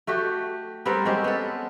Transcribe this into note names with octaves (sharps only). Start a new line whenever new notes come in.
A3 F#4 G4
G3 B3 C4 A#4
G#3 C4 C#4 G4
B3 A4